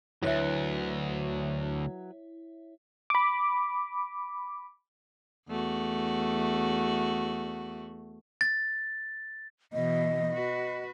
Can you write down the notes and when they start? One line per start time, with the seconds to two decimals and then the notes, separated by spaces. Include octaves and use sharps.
0.23 D2 G#2 F#3 E4 B4 C#5 E5 F#6
3.10 B5 D6
5.48 E2 A3 F#4
8.41 A6
9.73 B2 E3 D#5
10.33 F#4 B4